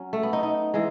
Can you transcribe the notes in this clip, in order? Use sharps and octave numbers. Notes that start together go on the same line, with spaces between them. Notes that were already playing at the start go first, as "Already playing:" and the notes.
Already playing: F#3 C#4
A3
B3
D#4
D#4
E3 G#3